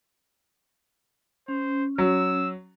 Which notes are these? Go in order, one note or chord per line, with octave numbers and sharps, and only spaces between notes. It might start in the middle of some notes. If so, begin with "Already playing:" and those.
C#4 C5
F#3 E6